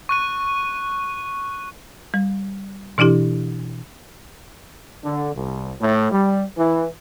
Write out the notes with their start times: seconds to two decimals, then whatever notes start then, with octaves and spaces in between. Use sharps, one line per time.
0.09 C#6 F#6 D#7
2.14 G3
2.98 B2 E3 D4 E4 G4
5.04 D3
5.34 C2
5.80 A2
6.12 G3
6.57 E3